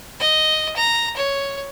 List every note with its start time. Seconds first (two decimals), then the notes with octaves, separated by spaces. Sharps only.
0.20 D#5
0.76 A#5
1.16 C#5